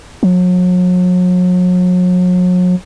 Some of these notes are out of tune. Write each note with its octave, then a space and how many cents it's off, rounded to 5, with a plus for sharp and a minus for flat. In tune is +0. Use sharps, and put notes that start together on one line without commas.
F#3 -40